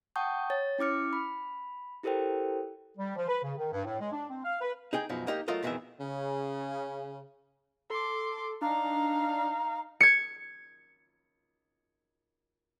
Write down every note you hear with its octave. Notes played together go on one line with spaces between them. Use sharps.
F#5 G5 A5 C#6 D#6 G6
C#5 A6
C#4 E4 D6 F6 C#7
B5
E4 G4 A4 A#4 C5 G5
G3
F3
B4
C#3
D#3
G2
A2
G#3
D4
C4
F5
B4
D#4 G#4 G5
F#2 B2 F3 D#4
A#3 D#4 G4
F#3 A3 F4 A#4 D#5
F2 B2 D#3 E3 G#4 E5
C#3
A4 C6 D6
D4 D#4 F5 A#5
G#6 C#7